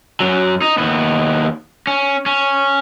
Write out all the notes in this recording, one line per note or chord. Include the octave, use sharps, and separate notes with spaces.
F#2 F#3
D#4
D#2 B3
C#4
C#4